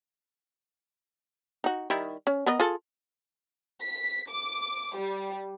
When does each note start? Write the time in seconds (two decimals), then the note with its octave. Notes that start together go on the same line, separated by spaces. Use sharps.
1.64 D#4 F#4
1.90 D#3 G3 E4
2.27 C#4
2.46 B3 A#4 D#5
2.60 F4 G#4 A4
3.83 B6
4.30 D6
4.97 G3